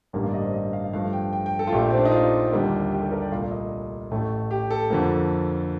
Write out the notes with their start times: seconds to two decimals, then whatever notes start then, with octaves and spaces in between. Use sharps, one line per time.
0.13 A1 G2 D3 G3 A#3
0.24 F5
0.29 D5
0.34 D#5
0.44 C5
0.53 D#5
0.73 F5
0.93 G2 F3 A3 F5
1.13 G5
1.33 G5
1.46 G5
1.59 A4
1.67 F4
1.72 A#1 A#2 A3 G4
1.91 C4
1.98 D4
2.05 D#4
2.12 F4
2.52 D#2 D3 G3 A#3
2.92 G4
3.02 A4
3.12 A#4
3.22 D5
3.31 C2 A#2 A3 F5
3.51 D#5
4.11 A1 A2 A3
4.51 G4
4.71 A4
4.90 F2 D3 F3 A#3